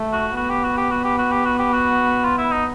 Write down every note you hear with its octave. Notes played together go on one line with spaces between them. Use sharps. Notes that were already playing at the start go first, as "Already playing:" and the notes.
Already playing: A3
F#4
B3 F#4
G4
F#4
G4
F#4
G4
F#4
G4
F#4
G4
F#4
F4
E4
D#4